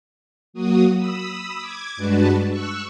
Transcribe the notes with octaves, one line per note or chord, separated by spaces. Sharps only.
F#3 A#3 F#4 D#6
B5 D#6 E6
D6 G#6
G2 G#3 D4 F#4 B4 A5
C#6 E6 F#6